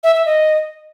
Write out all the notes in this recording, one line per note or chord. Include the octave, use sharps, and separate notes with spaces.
E5
E5
D#5